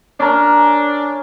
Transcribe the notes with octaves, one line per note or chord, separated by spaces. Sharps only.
C#4 D4 A#4